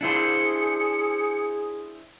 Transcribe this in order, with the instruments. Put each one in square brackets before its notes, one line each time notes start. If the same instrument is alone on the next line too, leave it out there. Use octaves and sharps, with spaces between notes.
[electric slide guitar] D4 E4 C5 [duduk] G#4 [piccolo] C#7